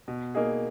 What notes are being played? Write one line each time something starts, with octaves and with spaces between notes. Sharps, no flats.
B2
A#3 D#4 G#4